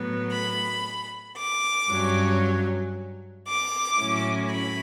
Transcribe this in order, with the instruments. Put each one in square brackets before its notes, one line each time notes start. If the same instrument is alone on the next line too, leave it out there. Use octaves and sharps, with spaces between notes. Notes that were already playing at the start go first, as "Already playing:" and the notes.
Already playing: [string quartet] A2 F#3 B3
B5
D6
G2 F#3 C#4
D6
A2 F#3 C#4 E4
B5